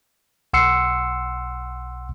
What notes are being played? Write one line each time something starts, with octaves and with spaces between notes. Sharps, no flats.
B1 F#5 C6 E6 C7 C#7